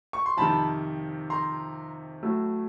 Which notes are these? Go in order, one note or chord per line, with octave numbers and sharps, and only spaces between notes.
C#6
C6
F2 C3 D#3 A5 B5
A#5 C6
A2 F#3 A3